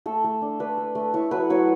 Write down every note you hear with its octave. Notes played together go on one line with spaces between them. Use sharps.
A3 A4
A3
D4
D4 B4
A3
A3
E4 C#5
F#3 B4
F#3 C#5